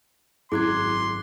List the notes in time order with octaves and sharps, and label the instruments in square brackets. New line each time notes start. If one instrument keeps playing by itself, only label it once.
[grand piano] G#1 F#2 [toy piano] E4 G#4 [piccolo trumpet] C6 [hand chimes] D6 F#6 G#6